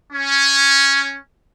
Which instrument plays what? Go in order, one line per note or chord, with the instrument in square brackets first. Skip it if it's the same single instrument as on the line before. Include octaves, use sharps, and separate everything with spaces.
[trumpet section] C#4